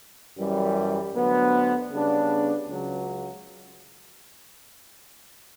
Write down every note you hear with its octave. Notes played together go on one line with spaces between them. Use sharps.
F#2 E3 G3
D2 D3 F#3 B3
C#3 G3 B3 D4
C#2 C#3 F#3